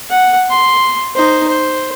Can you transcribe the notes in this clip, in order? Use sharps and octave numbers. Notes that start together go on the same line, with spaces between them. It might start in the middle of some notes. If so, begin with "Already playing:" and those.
F#5
C6
D#4 C5
C5